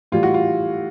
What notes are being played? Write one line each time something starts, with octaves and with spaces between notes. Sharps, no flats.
A2 E3 G3 F4
F#4
F4